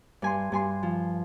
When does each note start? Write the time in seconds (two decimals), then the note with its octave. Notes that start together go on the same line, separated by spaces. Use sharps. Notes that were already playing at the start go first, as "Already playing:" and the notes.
0.22 G2 G#5 C6
0.52 G2 G#5 C6
0.83 F3